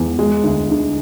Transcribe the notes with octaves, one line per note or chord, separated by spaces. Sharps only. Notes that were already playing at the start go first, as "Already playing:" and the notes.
Already playing: E2
G#3
D2
D3